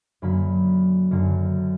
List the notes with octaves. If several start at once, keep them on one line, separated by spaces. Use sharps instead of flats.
F#2 D3 F#3 A#3 B5
F#2 D3 F#3 A#3